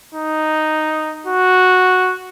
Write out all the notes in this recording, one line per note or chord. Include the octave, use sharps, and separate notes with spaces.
D#4
F#4